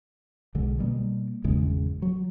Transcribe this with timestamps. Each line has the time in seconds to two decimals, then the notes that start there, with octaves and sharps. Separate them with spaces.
0.55 B1 D3 G#3
0.79 B2 G3 A#3
1.44 G#1 E2 C#3 G#3
2.02 F#3